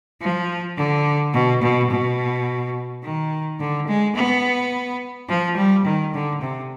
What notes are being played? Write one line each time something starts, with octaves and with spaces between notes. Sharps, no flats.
F3
D3
B2
B2
B2
D#3
D3
G#3
B3
F3
G3
D#3
D3
C3